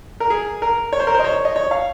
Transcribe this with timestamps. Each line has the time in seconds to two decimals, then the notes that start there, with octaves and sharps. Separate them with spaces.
0.20 A#4
0.30 G#4
0.62 A#4
0.93 C#5
1.00 C5
1.07 A#4
1.14 C5
1.19 D#5
1.24 C#5
1.45 D#5
1.56 C#5
1.71 F5